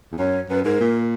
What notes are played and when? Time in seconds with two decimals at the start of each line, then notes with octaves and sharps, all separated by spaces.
0.12 E2
0.18 F#2 C#5
0.49 F#2 B4
0.64 G#2 A#4
0.80 A#2